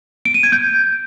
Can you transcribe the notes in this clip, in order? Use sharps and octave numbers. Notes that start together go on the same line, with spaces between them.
D7
D#7
G#6
G6